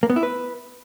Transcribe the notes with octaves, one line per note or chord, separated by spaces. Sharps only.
A#3
B3
E4
B4